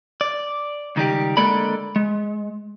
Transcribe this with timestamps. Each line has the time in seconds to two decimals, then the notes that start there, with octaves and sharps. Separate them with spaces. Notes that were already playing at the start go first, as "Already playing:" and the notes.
0.21 D5
0.96 C#2 D#3 G3 G4
1.37 D3 G#3 A#3 A4 D5 B5
1.96 G#3